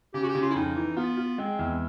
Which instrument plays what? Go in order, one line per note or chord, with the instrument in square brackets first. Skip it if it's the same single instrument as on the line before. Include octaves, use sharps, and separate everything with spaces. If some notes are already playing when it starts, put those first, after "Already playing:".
[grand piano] C#3 [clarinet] G4
[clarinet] F#4
G4
[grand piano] C#3
[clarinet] F4
E4
[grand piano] F2 [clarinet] D#4
[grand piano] E3
[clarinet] B3 [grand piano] F4
[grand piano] F4
[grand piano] G#3 [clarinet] C4
[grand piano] E2